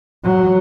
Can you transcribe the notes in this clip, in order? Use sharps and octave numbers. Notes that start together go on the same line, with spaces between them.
F#3